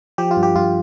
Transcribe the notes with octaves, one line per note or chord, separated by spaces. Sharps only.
F3 G4
F4
G2
G4
G2 F4